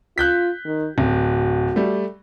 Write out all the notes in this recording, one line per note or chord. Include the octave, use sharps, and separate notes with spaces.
F4 F#6 G6 B6
D#3
D1 F#4
G3 A3